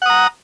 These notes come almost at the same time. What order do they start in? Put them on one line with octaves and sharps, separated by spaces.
F#5 D#6 A#5